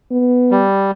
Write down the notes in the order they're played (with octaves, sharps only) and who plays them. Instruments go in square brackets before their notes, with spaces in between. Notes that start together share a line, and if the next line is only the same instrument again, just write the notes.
[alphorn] B3
[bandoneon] G3